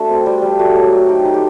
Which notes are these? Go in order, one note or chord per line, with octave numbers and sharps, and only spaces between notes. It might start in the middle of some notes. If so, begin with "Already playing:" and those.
Already playing: A3 D4 F#4
C4
G3
G3
A3 F#4
F#3
F#3
D#4 G4
D#4
G4